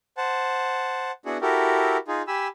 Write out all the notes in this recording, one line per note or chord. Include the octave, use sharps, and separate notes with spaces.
C5 F#5 A5
B3 D4 E4 F#4 G#4 F#5
E4 F#4 G4 A4 A#4
D#4 F4 G#4
G4 G#5 B5 E6